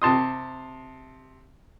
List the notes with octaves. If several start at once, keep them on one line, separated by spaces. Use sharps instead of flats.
C3 A5 C6 D#6